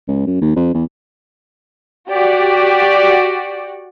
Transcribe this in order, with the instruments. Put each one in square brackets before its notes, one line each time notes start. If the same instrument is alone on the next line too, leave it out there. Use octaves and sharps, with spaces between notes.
[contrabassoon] C#2
F#2
D#2
F2
E2
[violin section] F#4 G4 D5